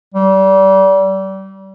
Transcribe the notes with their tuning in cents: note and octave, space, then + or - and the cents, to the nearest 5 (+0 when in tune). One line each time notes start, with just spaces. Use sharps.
G3 -30